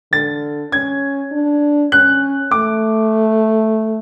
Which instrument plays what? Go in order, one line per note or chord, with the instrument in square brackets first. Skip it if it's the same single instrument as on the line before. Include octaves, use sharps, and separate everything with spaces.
[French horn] D3 [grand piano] A6
[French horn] C#4 [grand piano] G#6
[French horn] D4
[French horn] C#4 [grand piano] F#6
[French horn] A3 [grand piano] D6